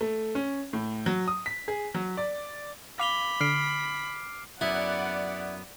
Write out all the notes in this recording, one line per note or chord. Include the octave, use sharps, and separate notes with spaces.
A3
C#4
A2
F#3
D#6
B6
G#4
F#3
D5
F5 B5 D6 F7 G7
D3 F6 C7 D7
F#2 B3 E4 D5 F#5